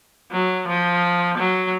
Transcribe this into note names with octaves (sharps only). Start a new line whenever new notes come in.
F#3
F3
F#3